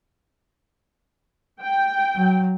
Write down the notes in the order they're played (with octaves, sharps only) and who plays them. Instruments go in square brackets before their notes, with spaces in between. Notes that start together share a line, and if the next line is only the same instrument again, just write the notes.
[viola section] G5
[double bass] F#3